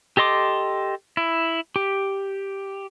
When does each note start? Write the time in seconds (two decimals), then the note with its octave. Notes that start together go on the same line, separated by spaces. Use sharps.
0.17 G4 A4 D#5 C6 D6
1.17 E4
1.76 G4